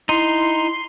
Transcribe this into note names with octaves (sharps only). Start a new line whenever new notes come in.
D#4 E4 C6